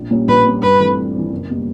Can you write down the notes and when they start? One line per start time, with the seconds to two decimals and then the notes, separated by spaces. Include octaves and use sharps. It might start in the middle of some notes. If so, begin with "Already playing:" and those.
Already playing: A#1
0.11 A#2 G3 A#3 C#4
0.28 A#1 B4
0.45 A#2 G3 A#3 C#4
0.63 G2 B4
0.79 E3 A3 C4
0.97 G2
1.14 E3 A3 C4
1.31 F#1
1.49 B2 G3 A#3